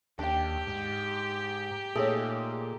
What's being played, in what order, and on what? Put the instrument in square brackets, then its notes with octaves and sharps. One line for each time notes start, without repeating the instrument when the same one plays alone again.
[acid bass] D#2 [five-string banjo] D4 G5 [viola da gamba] G4
[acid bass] G#2
[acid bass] A#2 [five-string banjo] A3 D#4 C#5 [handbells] G#4 A4